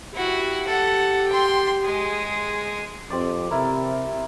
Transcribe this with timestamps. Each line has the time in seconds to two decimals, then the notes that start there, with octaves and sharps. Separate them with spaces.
0.14 E4 F#4 G4
0.66 A4 F#5
1.28 G5 C6
1.83 G#3 G#4
3.10 F2 C4 G4 D5
3.51 C3 E4 A#4